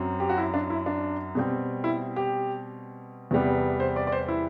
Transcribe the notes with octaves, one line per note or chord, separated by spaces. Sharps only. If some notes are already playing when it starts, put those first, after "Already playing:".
Already playing: F#2 F#3 C4
G4
F#4
E4
D4
E4
D4
B2 G3 C4
E4
G4
E2 C3 G3 B3
C5
D5
D5
C5
E4